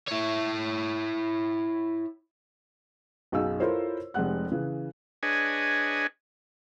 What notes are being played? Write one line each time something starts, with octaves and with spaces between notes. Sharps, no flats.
E4 C#5
B1 F#2 D#4 G#4 F5 E6
E4 F4 A4 A#4 C5 C#5
F1 C3 G#3 F#5 F#6
C#3 E3
D4 G#4 B4 C#5 D#5 G#5